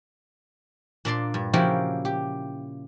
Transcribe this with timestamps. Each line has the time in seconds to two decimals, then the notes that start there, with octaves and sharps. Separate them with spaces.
1.05 A#2 D4 D5 C6
1.34 G2
1.53 C#3 F3 A#3 E4 F#4 G4
2.05 G4